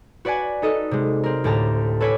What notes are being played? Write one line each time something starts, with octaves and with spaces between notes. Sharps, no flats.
F#4 B4 D5 F#5 G#5
D#4 A4 D#5
C3 G#3
C4 A#4
D2 A2 G4 A5 A#5
A4 B4 C#5 G#5 B5 D6